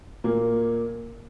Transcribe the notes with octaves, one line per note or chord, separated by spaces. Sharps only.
A#2 A#3